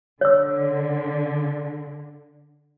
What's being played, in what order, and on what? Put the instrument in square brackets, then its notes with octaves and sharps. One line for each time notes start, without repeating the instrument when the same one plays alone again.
[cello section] D3 [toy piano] C#5 E6